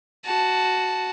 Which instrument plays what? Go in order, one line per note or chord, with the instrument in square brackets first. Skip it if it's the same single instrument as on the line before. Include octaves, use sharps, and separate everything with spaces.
[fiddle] F#4 A5